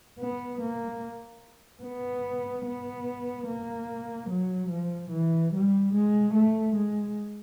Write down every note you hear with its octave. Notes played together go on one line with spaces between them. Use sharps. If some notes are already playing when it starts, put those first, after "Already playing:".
B3
A#3
B3
B3
A#3
F#3
F3
E3
G3
G#3
A3
G#3